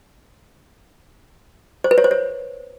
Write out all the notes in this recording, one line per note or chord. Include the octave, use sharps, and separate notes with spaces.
C5
B4
C#5
C5
C#5